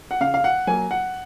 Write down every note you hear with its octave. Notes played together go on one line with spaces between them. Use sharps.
F#5
C#3 F5
F5
F#5
F#3 A#3 G#5
F#5